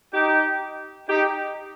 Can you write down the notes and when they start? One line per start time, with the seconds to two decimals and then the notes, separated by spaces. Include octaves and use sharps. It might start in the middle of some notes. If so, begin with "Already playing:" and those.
0.14 D#4 G4
1.08 D#4 G4